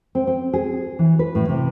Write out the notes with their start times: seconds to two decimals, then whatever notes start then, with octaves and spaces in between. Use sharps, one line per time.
0.15 C4
0.27 C4
0.53 G#4
0.99 E3
1.19 B4
1.35 A2
1.49 C3